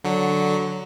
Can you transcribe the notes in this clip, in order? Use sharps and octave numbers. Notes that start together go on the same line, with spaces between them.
D3 F#3